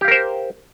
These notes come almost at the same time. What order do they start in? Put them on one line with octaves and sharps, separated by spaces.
G4 F5 A#4 C5